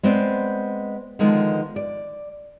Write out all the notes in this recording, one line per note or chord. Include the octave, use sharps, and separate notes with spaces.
G#3 B3 C4 C5 D5
D3 D#3 F3 G#3 B3
D5